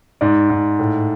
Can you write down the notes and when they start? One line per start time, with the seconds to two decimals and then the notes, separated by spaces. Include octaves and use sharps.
0.21 G#2 D5
0.50 G#2
0.79 A2